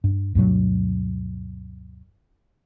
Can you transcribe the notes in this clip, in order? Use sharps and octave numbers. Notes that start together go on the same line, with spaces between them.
G2
D2 G2 B2 F#3